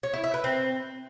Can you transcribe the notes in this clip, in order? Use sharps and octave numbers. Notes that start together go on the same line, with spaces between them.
C#5
E4
E5
B4
C4